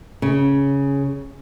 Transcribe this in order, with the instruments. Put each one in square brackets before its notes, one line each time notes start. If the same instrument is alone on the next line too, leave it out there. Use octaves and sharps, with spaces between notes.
[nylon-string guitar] C#3